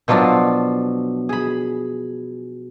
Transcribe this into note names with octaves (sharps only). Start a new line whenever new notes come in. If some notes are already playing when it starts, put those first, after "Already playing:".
B2 F3 F#3 D4 F4
G#4 B5